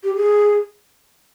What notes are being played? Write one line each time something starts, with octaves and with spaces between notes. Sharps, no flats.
G4
G#4